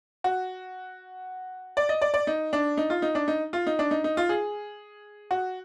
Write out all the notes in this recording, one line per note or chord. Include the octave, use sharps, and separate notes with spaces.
F#4
D5
D#5
D5
D5
D#4
D4
D#4
F4
D#4
D4
D#4
F4
D#4
D4
D#4
D#4
F4
G#4
F#4